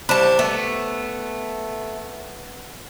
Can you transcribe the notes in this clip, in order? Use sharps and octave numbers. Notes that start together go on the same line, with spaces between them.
G3 D4 C5 A5 B5
A3 B3